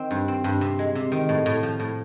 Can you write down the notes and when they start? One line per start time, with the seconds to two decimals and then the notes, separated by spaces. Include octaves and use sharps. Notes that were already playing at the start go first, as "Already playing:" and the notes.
Already playing: D#3 C4
0.11 G2
0.28 C4
0.44 G2
0.61 C3
0.79 G#3
0.95 C3
1.12 D#3
1.29 A2
1.46 A2
1.63 F3
1.80 A2